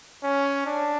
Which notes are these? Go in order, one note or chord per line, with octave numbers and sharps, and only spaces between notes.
C#4
D4